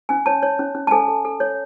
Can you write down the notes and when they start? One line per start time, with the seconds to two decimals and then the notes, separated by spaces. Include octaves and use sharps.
0.09 C#4 G#5
0.26 C#5 A5
0.43 C#5
0.59 C#4
0.75 C#4
0.87 A5
0.91 A4 G#5
1.08 A4
1.25 A4
1.40 C#5